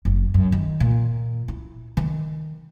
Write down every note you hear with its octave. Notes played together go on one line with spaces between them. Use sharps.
F#1
F#2
D#3
A#2
E4
D#3